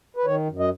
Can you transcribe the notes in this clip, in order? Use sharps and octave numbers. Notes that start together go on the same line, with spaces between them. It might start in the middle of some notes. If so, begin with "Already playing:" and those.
B4
D#3 C#5
F#2
D#5